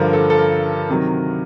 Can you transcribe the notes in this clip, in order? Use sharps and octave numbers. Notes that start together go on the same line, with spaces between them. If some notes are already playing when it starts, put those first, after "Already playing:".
Already playing: G2 D3 F3 A#4
A4
A4
A#4
C3 D#3 F#3